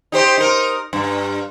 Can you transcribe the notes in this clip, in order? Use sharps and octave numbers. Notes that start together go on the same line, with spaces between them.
D#4 G4 C5
D#4 A#4
G2